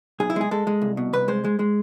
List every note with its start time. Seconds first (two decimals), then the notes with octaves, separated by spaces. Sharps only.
0.20 B1 G#4
0.30 E4
0.36 G#3 G#4
0.51 G#3 A4
0.67 G#3
0.82 C2
0.97 B2
1.13 C2 B4
1.28 G#3 C5
1.45 G#3
1.59 G#3